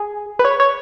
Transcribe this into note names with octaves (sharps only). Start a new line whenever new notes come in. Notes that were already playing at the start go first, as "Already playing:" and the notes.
Already playing: G#4
B4
C#5
C#5